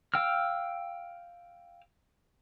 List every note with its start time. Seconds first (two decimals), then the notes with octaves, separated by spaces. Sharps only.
0.14 F5 G5 E6 F6